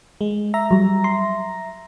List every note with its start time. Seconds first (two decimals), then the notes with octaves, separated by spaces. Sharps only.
0.21 G#3
0.54 E5 A#5 A#6
0.71 F#3 G3
1.04 C6